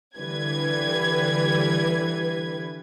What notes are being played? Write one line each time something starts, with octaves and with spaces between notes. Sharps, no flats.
D3 E3 G3 B4 G#6